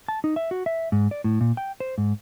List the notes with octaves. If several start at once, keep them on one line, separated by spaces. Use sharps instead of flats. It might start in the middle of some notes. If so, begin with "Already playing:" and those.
A5
D#4
E5
F#4
E5
G#2
D5
A2
A#2
G5
C5
G#2